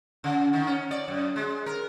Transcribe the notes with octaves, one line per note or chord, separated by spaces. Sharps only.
C#3
D#3
C#4
D5
F#2
G#3
A#4